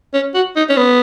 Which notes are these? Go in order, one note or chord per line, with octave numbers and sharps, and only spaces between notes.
C#4
F#4
D#4
C#4
B3